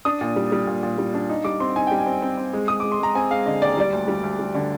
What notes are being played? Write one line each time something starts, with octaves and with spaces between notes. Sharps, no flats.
D4 D#6
A#2
G3
G3
A#2
A#2
G3
D4
D#4
G3 D6
C4 C6
D#4 G#5
G3 G5
G#5
C4
C4
C4
G#3
G#3 D#6
G#3 D6
C6
G#3 A#5
C4 G#5
G#3 F5
D3 D#5
D#2 D5
G3 D5
D2
G3
D2
G3
D3